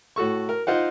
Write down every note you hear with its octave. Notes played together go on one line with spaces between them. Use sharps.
A2 F#4 A4 C#6
A#4
D#4 F4 C5 F#5